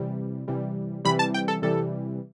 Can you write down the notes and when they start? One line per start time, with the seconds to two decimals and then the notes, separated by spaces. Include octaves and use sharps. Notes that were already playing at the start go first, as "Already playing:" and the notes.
Already playing: C3 E3 G3
0.48 C3 E3 G3
1.05 C3 E3 G3 B5
1.19 A5
1.34 G5
1.48 A4
1.62 C3 E3 G3 A4